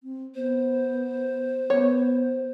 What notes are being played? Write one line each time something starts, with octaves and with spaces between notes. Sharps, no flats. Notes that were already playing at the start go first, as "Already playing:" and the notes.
C4
B3 C5
B3 C#5